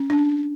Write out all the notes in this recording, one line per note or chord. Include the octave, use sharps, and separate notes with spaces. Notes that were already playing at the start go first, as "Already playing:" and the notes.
Already playing: C#4
D4